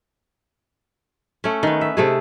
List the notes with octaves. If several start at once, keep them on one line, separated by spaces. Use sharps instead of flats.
A3 C#4
D#3 B3
E5
C3 A3 G#4